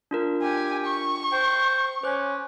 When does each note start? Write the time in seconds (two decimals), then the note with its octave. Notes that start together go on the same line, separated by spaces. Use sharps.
0.11 D4 F4 A#4
0.42 G4 G#5
0.85 C#6
1.32 C5 G5
2.03 C#4 C5 D6 F#6